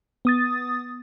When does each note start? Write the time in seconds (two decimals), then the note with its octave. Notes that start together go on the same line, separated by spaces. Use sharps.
0.25 B3 D#6 A6